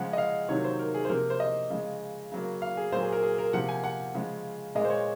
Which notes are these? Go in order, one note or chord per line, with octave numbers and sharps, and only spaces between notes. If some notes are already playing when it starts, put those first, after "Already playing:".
Already playing: C#3 F3 G#3 F#5
D#5
F5
C3 D#3 F#3 A#3 C#5
C5
A#4
G#4
C5
C3 F3 A#3 A#4
C5
D#5
C#3 F3 G#3
C#3 F#3 A#3
F5
G#4
A#2 F#3 A#3 C5
G#4
A#4
G#4
A#4
C3 F3 A#3 F#5
G#5
F#5
C#3 F3 G#3
A#2 G#3 D#5
C5
C#5